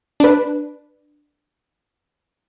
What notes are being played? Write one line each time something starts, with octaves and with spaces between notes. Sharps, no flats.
D4 B4